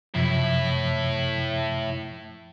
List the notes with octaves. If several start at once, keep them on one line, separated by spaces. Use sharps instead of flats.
F#2 A2 C3 F3 E4